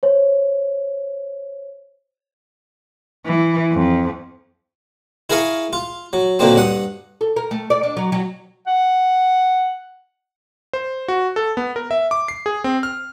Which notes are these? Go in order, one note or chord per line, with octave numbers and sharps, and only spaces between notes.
C5 C#5
E3
F2
E4 G#4 A#4 F5 G#5 C#6
F4
F#3
A#2 D3 F#3 A#3 C4
G2 F#5 D#6
A4
A#4
A3
D5
D4
F#3
F#3
F#5
C5
F#4
A4
B3
A#4
E5
D6
C7
G#4
C4
F6